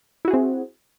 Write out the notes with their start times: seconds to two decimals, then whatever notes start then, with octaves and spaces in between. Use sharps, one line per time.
0.25 E4
0.28 F#4
0.31 G#4
0.34 C4